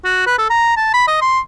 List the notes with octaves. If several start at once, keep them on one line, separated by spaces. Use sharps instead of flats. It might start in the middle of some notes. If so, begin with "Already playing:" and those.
F#4
B4
A4
A#5
A5
B5
D#5
C6